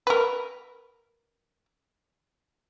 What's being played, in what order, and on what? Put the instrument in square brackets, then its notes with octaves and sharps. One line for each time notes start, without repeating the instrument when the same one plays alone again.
[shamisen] A#4 B4